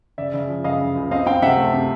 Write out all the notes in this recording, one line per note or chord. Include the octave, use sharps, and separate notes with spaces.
C#3 D5 E5
C#3
F3
C#3 D#5 F5
C#3
C#2
C4 D#5 F5
C4 F5 G5
C3 E5 F#5
A3
C3